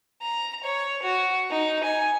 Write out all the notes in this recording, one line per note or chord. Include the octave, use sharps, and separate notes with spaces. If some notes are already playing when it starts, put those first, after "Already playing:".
A#5
C#5
F#4
D#4
G#5